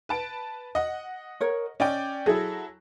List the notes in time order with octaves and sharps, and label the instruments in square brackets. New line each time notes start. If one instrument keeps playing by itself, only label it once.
[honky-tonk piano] B4 A5 D7
D#5 F#5
[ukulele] A#4 C#5
[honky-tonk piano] C#4 D5 G5 [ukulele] D#5
[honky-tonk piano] F#3 E4 [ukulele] G#4 A4